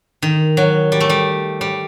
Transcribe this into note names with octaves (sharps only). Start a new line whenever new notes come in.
D#3
F#3
G3
A3
G3
G3